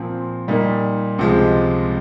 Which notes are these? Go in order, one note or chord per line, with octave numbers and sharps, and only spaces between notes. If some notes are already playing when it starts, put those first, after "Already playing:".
Already playing: A#2 F3 C4
A#2 G3 A#3 D#4
C#2 C3 F3 G#3